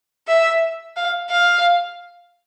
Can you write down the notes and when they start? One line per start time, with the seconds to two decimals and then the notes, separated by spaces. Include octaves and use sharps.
0.28 E5
0.96 F5
1.30 F5